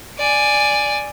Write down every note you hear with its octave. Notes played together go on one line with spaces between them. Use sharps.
D5 G#5